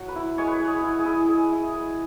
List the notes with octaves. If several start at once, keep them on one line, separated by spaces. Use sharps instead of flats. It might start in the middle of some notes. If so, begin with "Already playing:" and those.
Already playing: F#3 F#4
B4
E4
G#3 C#5
B4
G#3 C#5
G#4
E4
G#4
E4
G#3 G#4
E4
G#3 B4